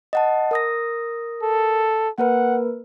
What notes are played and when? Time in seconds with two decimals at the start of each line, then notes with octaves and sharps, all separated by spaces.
0.13 D#5 F#5 A5
0.51 A#4 D#6 A#6
1.42 A4
2.18 A#3 A#4 B4 F#5